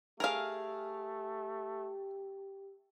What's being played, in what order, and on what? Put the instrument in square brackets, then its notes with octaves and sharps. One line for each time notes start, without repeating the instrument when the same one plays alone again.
[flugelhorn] A3 [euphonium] G4 [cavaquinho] G#4 E5 G#5 [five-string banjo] A#4 F5